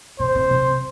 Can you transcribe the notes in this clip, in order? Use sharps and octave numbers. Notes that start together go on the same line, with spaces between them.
C3 C5
C3
C3